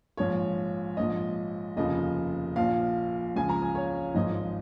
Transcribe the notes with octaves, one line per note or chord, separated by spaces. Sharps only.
A#1 G#2 F3 C#5
A#1 G#2 F3 D#5
F1 D#2 C#3 F3 D#5
A#1 A#2 F3 F5
C#2 C#3 F3 G#5
A#5
G#5
C#5
G#1 G#2 F3 D#5